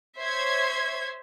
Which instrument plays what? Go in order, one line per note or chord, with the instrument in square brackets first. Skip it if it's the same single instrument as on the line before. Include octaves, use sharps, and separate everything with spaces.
[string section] C5 C#5 E5 G#6